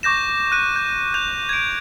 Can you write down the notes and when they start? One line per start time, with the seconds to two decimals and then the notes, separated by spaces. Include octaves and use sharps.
0.03 C#6 D6 G6 A#6 E7
0.52 F#6 D#7
0.76 G6
1.14 G6 F7
1.49 G#6 D7